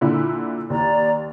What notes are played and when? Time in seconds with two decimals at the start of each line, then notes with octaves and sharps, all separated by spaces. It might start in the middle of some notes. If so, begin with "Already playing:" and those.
0.01 A#2 D3 E4
0.70 D#2 D5 A#5